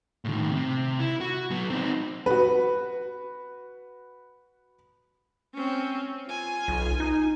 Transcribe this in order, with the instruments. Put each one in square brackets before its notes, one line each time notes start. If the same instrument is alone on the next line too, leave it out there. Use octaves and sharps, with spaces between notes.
[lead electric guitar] A2 D#3
C3
E4
F#4
F#3 B3
C4 D#4
[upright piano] F#4 B4
[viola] C4 C#4
F4 G#5
[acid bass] B1
D#4